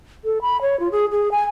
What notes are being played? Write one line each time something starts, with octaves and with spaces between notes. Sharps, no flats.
A4
B5
C#5
F4
G#4
G#4
G#5